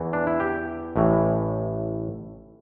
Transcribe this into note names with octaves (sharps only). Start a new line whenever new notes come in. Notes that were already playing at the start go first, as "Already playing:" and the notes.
Already playing: E2 E3
D4
E4
G4
A1 A2 E3